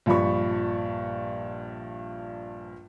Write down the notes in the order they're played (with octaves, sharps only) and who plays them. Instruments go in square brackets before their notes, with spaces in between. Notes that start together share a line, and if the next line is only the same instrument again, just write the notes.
[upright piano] A#1 G2 F3 B5 C#6